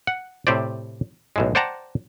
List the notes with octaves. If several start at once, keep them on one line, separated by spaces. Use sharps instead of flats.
F#5
A2 C3 G4 C5 D5
B1 A2 G#3
C5 D5 F#5 G5 A5 A#5